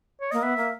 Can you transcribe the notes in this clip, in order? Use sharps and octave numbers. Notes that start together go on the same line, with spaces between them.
C#5
A#3 D#5
B3 E5
A#3